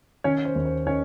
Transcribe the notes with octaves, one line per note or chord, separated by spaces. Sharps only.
D#3 C#4 C#5
C5
D#2
C5
D#3 C#4 C#5